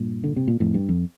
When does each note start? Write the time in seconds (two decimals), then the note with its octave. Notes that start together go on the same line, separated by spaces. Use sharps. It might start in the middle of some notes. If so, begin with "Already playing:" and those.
Already playing: G2 A#2
0.24 D3
0.36 C3
0.48 A#2
0.60 F2 A2
0.74 G2
0.89 F2